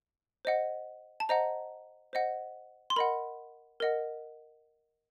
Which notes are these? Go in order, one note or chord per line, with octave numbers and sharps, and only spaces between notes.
C5 D#5 F#5
A5
C5 D#5 F#5 A#5
C5 D#5 F#5
C6
A#4 D#5 F#5 B5
A#4 D#5 F#5